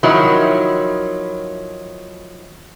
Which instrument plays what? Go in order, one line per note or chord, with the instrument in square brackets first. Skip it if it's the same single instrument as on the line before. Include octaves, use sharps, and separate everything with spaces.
[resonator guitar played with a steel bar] D#3 F3 F#3 E4